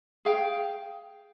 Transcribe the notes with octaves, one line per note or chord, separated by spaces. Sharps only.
G#4 F5 G5